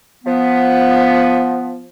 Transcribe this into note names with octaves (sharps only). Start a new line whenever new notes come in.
F3 B3